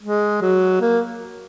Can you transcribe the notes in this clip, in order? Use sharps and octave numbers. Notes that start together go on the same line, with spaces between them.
G#3
F#3
A#3